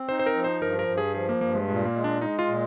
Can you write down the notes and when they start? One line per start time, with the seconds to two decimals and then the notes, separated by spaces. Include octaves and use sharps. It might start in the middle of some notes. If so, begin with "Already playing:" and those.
Already playing: C4
0.09 D#4 C5
0.19 C5
0.26 A#4
0.35 F3
0.44 C5
0.61 G2 A#4
0.79 A#4
0.88 G2
0.98 G#4
1.15 F3 G#4
1.29 A#3
1.41 G2 A#3
1.55 G#3
1.68 A#2 G#3
1.85 A#3
1.95 G#3
2.04 D4
2.21 G#3 D#4
2.39 F4
2.48 A#2